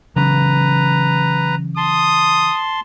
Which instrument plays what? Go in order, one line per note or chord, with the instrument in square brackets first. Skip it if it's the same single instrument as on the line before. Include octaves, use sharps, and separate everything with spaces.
[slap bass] C#3 E3 F#3 [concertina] B4 A#5
[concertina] A5 C6 [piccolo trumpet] D#6